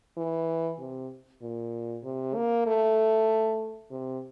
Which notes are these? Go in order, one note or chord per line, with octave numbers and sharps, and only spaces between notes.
E3
C3
A#2
C3
A#3
A3
C3